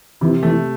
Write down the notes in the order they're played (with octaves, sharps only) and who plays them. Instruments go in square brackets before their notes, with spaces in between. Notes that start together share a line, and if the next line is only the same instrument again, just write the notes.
[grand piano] C3 [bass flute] E3
[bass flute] E3 [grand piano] A3